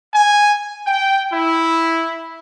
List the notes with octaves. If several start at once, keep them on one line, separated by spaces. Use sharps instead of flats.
G#5
G5
E4